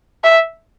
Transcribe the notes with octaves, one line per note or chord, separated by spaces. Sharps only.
E5